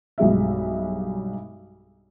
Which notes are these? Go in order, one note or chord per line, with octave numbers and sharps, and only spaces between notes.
B1 G2 G#3 E5